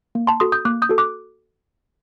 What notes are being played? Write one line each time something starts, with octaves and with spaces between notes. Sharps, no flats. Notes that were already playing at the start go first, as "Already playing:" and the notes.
A#3
A5 C6
F#4 A4 C6 D#6
D#6 G6
A#3 D6 F#6
D#6 G6
F#4 A4
D6 F#6